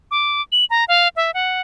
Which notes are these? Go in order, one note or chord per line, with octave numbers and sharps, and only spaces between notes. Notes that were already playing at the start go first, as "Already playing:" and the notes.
D6
F#7
A#5
F5
E5
F#5